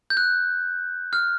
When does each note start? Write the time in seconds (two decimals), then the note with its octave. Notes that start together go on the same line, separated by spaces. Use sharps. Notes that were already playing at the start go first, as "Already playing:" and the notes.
0.10 G6
0.17 F#6
1.13 F6